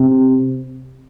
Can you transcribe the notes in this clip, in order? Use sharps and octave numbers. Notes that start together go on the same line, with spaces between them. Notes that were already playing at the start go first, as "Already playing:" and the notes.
Already playing: C3